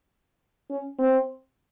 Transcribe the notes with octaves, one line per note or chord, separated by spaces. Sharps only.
C#4
C4